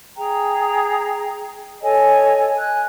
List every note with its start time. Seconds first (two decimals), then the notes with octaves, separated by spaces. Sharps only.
0.17 G#4 G5 A#5
1.82 A4 C#5 D#5 G#5
2.57 G#5 F#6